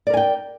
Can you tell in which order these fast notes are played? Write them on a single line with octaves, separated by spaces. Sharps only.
D5 A#4 G#5 G5